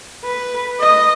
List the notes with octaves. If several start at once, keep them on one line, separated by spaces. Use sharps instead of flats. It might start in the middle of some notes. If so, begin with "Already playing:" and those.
B4
D#5